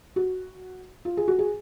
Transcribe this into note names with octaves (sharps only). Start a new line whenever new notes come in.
F#4
F4
G#4
F#4
G#4